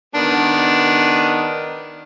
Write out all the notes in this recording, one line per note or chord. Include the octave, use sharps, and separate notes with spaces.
D#3 B3 D4